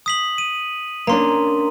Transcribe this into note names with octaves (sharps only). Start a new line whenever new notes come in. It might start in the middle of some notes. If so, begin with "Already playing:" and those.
D#6 B6 F#7
D#7
A#3 C#4 D4 A#5 C6